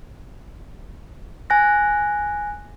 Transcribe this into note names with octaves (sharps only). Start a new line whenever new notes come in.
G#5 F#6 A#6